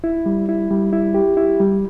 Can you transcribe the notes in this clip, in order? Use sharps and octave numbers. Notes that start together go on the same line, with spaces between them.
E4
G3
E4
G3
E4
G4
E4
G3